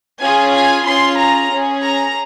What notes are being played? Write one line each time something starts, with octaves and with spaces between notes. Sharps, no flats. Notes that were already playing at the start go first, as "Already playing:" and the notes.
C#4 F4 G#4 G#5
G#5
C#4 F4 G#4 C6
A#5
C#4 G#4
A#5